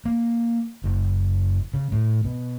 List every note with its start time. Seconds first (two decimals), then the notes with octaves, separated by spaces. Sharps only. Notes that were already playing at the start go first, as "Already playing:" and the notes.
0.05 A#3
0.84 F#1
1.73 C#3
1.92 A2
2.24 B2